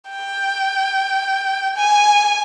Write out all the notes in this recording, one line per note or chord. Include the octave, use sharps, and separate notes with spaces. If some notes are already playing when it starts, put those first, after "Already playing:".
G5
G#5